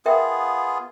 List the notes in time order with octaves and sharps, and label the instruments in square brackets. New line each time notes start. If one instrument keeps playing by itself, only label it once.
[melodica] B3 F4 G#4 [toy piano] A#4 E5 G5